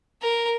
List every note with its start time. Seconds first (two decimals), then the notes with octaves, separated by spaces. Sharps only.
0.22 A#4